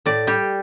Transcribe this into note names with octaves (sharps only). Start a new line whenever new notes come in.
A2 D5
G3 G4